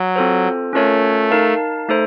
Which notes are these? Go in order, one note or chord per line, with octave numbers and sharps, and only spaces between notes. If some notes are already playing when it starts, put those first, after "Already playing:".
Already playing: F#3
C4 F4 A4 C5
A3 C#4 F4 A#4 C#5
D#4 A#4 F5 A5
A3 D#4 A4 C5